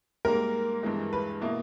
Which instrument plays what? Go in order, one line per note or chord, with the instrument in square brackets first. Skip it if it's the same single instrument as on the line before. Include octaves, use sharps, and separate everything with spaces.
[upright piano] G#2 G3 A#3 [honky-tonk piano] A#4
[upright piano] G2 E3 G#3
[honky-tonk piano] B4
[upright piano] B2 A#3 E4